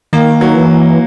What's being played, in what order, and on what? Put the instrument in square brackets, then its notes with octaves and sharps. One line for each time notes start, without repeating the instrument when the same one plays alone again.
[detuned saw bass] D#3 [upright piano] A#3
[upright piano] F#3
[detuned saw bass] E3